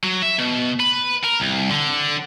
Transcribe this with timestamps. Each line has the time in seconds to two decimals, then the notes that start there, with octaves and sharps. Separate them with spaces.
0.04 F#3
0.23 E5
0.39 B2
0.80 B4
1.24 A#4
1.40 C2
1.70 D3